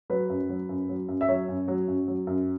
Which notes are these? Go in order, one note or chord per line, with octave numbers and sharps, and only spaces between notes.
F#3 B4
F#2
F#3
F#2
F#3
F#2
E5
F#3 C#5
F#2
F#3
F#2
F#3
F#2